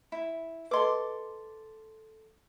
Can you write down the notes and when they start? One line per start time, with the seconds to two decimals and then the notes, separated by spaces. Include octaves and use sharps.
0.12 E4
0.71 A4 B4 D#5 C6 D6